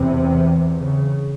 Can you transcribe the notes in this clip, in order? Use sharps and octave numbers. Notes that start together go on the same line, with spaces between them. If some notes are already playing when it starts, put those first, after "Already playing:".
Already playing: E2 C3
C#3